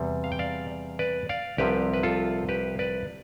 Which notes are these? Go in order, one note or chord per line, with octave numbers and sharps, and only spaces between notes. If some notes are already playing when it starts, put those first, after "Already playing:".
Already playing: E2 C3 G3
F5
G5
D5 F5
B4 D5
D5 F5
C2 C3 F3 G4 B4
B4
F4 A4
G4 B4
B4 D5